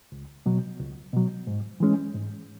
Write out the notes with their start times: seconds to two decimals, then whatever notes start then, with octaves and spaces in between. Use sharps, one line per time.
0.12 C#2
0.46 B2 F#3
0.79 C#2
1.13 B2 F#3
1.47 G#2
1.80 E3 G#3 C#4
2.14 G#2